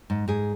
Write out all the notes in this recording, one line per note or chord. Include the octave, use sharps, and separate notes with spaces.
G#2
G#2 G#4